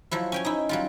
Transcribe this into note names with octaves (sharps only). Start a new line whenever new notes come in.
F3 F#3 E4
C#4 G5 G#5
D#4 E4
F#3 G3 F4